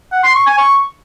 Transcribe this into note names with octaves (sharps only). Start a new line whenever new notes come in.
F#5
C6
C#6
G#5
C#6